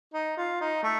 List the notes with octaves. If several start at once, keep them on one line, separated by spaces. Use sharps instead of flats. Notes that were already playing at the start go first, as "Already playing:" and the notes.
D#4
F4
D#4
A3